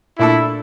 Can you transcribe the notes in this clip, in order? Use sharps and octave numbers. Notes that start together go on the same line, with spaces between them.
A#2 A3 D4 E4 A4